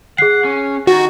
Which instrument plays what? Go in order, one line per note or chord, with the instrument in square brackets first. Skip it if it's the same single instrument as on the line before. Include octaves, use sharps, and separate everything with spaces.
[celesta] G#4 C7 [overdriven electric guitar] F#5
[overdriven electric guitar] C#4
[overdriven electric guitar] D#3 [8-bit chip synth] F#4